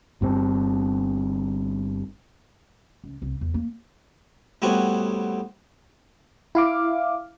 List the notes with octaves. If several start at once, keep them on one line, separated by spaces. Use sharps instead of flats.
G1 G2 B2 C4
C#2
C2
E2
A#3
A2 G3 B3 C4 F#4 G#5
E4 F5 D6